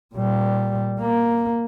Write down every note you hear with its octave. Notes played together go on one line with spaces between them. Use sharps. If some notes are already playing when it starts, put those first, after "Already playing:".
A#2 G3
A#3